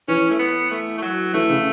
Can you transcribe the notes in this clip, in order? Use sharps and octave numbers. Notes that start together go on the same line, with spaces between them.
E3 C#4
A3
B3
A3
A3
F#3
E3 A3
C#3